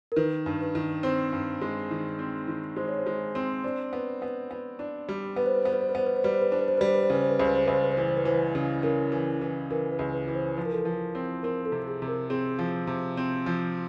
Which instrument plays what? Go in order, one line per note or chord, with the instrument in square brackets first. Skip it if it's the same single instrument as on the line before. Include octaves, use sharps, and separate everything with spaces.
[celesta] A#4
[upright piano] D#3 [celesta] B4
[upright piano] G2
[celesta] B4
[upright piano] D#3
[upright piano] C4 [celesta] C5
[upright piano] G2
G#3
D#3
C4
D#3
[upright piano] G#3 [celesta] C5
[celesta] C#5
C5
[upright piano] G#3
C4
[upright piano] D4 [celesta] C5
[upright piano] B3
B3
B3
D4
G3
[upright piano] B3 [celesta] B4
[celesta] C5
B4
[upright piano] B3 [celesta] C5
[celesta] B4
C5
B4
[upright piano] B3 [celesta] C5
[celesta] B4
C5
[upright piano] G3 [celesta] B4
[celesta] C5
B4
[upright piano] D4 [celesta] C5
[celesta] B4
C5
[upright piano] G3 [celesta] B4
[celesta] C5
B4
C5
[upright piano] C#3 [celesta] B4
[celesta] C5
B4
[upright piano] C#2 [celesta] C5
[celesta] B4
C5
[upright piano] C#2 [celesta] B4
[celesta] C5
B4
C5
[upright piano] E3 [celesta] B4
[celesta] C5
B4
[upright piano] E3 [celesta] C5
[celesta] B4
[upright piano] C#3
[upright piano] C#3 [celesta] A#4
[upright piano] E3
E3
[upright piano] E3 [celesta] A#4
[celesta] B4
[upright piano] C#2
[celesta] B4
[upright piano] E3 [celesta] B4
[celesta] C5
[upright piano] F3 [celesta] B4
[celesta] A#4
A4
[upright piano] F3 [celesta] A#4
[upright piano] C4
[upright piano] C4 [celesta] A#4
[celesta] A4
[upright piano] C3
[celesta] G#4
[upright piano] C3
[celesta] A#4
[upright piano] C4 [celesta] G#4
[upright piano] F3
C3
C4
F3